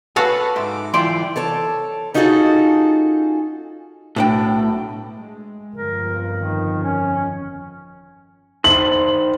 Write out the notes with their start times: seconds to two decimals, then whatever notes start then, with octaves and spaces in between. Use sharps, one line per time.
0.16 F#4 A4 B4 C#5 F5 G#5
0.56 G#2 E5 C6 D6
0.94 E3 E4 F4 D5 G5 C6
1.36 A4 C#5 A5
2.14 C#4 D#4 F4 F#4 G#4 A4
4.16 B1 A2 D4 G5
5.15 G#3
5.75 G1 F2 F3 A#4
6.35 D#3
6.83 C#4
8.64 D#3 C5 F#7